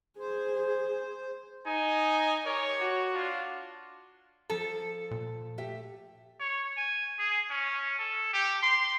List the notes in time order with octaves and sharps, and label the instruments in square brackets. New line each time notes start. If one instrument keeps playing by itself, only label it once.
[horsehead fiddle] G#4 [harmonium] C5
[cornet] D#4 [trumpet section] D#5 G#5
[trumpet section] G4 C#5 [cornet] A#4
[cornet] F#4
[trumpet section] D4 F4
[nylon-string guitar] F3 A5 [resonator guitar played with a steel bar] A4
[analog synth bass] A#2
[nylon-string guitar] A3 G4 E5
[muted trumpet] C#5
G#5
G#4
C#4
A4
G4
C6